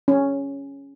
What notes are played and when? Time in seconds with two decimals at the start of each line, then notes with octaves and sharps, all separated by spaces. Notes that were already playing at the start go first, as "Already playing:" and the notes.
0.08 C#4